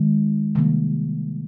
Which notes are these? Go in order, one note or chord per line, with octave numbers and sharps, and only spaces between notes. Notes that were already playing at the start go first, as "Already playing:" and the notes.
Already playing: D#3 G#3
C3 D#3 G3 A#3